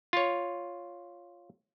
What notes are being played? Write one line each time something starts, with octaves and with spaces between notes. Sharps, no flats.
F4 C#5